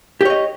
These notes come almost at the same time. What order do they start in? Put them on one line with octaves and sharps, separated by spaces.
G4 C#5 D#5